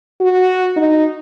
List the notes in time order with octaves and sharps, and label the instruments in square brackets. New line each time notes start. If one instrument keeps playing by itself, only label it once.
[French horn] F#4
D#4